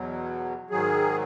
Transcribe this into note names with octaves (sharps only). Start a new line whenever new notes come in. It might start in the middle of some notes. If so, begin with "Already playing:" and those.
Already playing: E2 B2 F#3
G#2 D#3 F#3 G#4